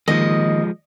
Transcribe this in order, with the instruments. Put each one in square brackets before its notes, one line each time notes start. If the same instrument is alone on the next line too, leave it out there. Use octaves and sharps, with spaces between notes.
[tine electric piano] D#3 A#3 [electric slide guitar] F3 G#3 [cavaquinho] D#5